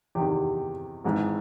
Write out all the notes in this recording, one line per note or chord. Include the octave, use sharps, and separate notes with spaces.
E2 C3 D#3 G4
G#1 G#2 E3